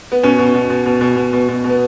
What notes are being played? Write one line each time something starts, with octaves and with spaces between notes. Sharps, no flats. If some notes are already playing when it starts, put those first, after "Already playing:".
B3
B2 C#4
B2
B2
B2
B2
B2
B2
B2
B2
B2
B3